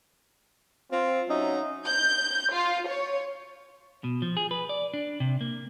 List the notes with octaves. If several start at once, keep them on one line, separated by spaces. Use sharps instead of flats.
C4 F4
F#3 C#4 D#4 E5
G6
F4
C#5
B2
F3
G#4
B4
D5
D4
C3
A#3